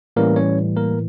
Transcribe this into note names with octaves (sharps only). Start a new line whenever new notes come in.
A2 E3 G3 A#3 C#4 A#4
C#4 C#5
A#3 A#4